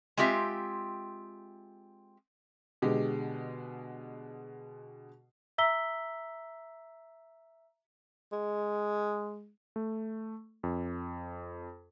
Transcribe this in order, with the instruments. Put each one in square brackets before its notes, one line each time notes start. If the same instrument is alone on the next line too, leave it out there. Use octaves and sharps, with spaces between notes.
[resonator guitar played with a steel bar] G#3 C4 F4 G4 E5
[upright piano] B2 D3 G#3 G4
[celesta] E5 A#5 E6 B6 G7
[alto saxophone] G#3
[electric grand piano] A3
F2